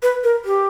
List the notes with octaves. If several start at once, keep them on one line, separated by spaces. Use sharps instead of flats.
B4
A#4
G4